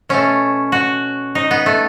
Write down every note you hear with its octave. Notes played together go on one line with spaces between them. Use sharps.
B2 A3 C#4
F#4
D#4
B3
A3